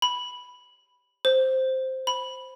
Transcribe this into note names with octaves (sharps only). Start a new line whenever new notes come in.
B5
C5
B5